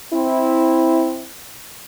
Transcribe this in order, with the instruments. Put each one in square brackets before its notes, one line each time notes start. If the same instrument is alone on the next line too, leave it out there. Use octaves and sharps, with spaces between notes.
[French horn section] C4 E4